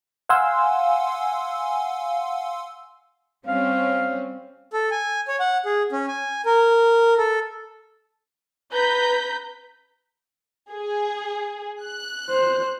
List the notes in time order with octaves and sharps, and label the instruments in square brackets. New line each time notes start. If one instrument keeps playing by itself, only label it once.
[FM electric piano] F5 F#5 G#5 C6 E6
[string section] G3 C4 C#4 [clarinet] F5
[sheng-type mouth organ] A4
G#5
C#5
F#5
G#4
C#4
G#5
A#4
A4
[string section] B4 A#5 G6 B6
[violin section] G#4
F#6
[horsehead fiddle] C5